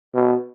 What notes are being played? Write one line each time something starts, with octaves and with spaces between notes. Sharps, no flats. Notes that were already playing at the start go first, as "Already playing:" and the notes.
B2